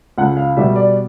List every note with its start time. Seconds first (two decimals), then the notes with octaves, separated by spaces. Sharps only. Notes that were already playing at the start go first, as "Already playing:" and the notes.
0.18 C#2 F#5
0.37 F5
0.57 B2 G3 E5
0.76 D5